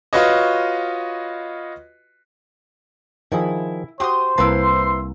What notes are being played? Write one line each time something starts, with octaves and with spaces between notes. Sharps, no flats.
F4 F#4 B4 C#5 D#5
D#3 F3 E4 G#4
F#4 G4 C5 C6 D6 D#6
C2 A#3 E4 B4 A5 C6